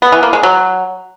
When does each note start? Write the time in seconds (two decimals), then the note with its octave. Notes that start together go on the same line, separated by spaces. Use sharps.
0.02 B3
0.12 E3
0.23 A#3
0.33 G#3
0.43 F#3